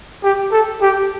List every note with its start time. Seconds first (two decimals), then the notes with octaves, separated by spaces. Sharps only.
0.24 G4
0.52 A4
0.82 G4